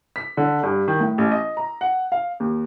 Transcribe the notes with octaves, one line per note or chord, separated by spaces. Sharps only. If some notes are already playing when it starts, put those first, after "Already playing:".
B6
D3
G2
D#3
A2
A1
D#5
A#5
F#5
F5
D#2